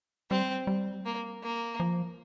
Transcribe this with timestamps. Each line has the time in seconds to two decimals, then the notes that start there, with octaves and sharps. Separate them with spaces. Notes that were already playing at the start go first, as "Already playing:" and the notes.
0.30 G3 C4
0.67 G3
1.05 A#3
1.43 A#3
1.80 F3